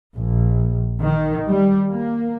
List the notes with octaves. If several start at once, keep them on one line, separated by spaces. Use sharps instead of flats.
A#1
D#3
G3
A#3